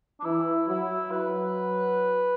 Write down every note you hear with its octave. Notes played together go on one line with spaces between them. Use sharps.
D4
E3 E4
F#3 E4
F#3 B4